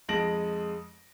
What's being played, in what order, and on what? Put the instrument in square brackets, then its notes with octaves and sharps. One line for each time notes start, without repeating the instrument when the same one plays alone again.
[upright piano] F2 G#3 A5 A#6 D7 F#7